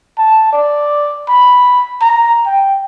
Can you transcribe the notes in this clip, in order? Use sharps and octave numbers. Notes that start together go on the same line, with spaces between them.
A5
D5
B5
A#5
G5